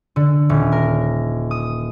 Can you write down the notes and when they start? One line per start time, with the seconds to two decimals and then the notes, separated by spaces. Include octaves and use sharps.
0.16 D3
0.49 D#1
0.72 A#4
1.51 D#6